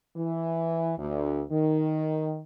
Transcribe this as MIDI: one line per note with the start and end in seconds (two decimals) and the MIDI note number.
0.16 0.93 52
0.98 1.42 38
1.52 2.41 51